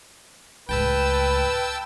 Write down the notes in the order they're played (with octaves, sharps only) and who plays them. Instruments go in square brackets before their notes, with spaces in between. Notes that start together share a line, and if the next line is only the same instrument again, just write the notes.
[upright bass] C#2 A2 [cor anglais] B4 [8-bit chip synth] G5 A5 E6